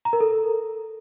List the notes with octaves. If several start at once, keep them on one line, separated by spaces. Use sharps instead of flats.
A#5
A#4
A4